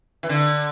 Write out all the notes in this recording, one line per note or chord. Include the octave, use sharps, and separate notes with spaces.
E3
D3